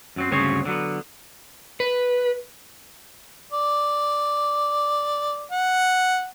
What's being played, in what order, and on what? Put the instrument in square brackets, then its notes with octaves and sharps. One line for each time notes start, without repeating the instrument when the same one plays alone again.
[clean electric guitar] F#2 F#3 C4
D2 G2 C#3 F#3 C4 C#5
D3 F#3 B3
[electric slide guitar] B4
[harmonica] D5
F#5